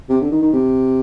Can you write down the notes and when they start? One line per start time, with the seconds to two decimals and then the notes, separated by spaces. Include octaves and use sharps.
0.09 C3
0.21 D3
0.32 D#3
0.42 D#3
0.53 C3